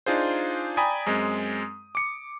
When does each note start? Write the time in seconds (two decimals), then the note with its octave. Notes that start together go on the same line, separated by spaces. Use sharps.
0.06 D4 D#4 F4 G#4 C5
0.77 D5 G5 G#5 A#5 B5 D#6
1.06 F#2 G#3 C4
1.95 D6 C#7